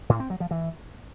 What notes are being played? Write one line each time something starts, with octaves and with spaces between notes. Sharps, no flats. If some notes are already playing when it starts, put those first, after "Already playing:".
A2
C4
F#3
F3
E3